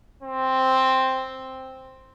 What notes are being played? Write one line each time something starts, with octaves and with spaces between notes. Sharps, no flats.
C4